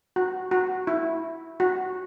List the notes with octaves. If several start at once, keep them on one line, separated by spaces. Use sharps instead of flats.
F#4
F#4
E4
F#4